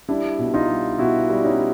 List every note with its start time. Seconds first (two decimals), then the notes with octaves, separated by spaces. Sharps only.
0.08 G3 D4 E4
0.39 B2
0.54 D#4 F4
0.68 G3
0.98 B2 E4 F#4
1.29 G3
1.44 C#4 D#4